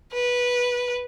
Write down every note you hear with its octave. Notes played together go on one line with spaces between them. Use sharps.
B4